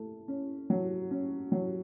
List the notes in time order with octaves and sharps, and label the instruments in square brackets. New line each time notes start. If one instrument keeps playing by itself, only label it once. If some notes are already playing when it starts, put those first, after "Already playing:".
Already playing: [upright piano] A3
C#4
F#3
C#4
F#3